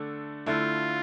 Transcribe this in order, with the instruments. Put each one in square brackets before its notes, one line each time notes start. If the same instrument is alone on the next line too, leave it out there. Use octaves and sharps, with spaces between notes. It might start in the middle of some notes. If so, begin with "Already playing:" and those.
Already playing: [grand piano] D3 A3 D4 A4
[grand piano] D3 A3 E4 [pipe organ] F4